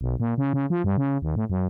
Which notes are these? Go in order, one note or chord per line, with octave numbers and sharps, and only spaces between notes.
B1
A#2
C#3
C#3
F3
G2
C#3
D#2
A2
F#2